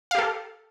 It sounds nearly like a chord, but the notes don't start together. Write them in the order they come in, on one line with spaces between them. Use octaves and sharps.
F5 G4 A4